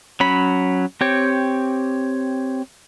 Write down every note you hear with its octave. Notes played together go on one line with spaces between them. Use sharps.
F#3 C#4 B5
C4 G4 C#5